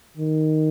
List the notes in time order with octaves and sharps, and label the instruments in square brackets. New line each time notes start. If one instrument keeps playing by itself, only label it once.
[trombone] D#3